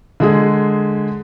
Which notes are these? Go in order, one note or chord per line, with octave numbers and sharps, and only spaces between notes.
D3 G#3 G#4